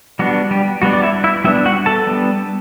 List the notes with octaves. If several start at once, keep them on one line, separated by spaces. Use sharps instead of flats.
G3 B3 D4 F#4
G3 G4
G3 B3 D4 F#4
D5
E4 E5
E4 E5
G3 B3 D4 E4 E5
F#4 F#5
A4 A5
G3 B3 D4